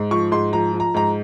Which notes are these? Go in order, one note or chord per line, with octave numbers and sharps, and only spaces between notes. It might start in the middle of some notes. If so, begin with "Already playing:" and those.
Already playing: G#2
F3 C#6
G#2 C6
F3 A#5
F3
A#5
G#2 A#5